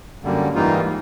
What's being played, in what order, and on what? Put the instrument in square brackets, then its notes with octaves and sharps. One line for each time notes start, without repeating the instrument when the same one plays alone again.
[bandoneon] F#2 D3 G3 A#3
G#2 E3 G3 A#3 D#4 F4